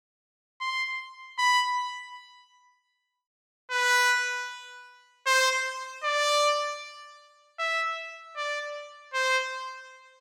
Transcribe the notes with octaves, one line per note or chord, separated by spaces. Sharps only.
C6
B5
B4
C5
D5
E5
D5
C5